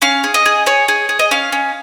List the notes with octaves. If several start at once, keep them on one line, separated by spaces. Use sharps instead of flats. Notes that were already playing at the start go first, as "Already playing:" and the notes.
C#4 F5
G#4
D#5
G#4
G#4 C#5
G#4
G#4
D#5
C#4 F5
C#4